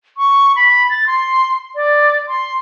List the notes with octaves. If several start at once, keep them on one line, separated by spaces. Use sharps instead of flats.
C#6
B5
A6
C6
D5
C6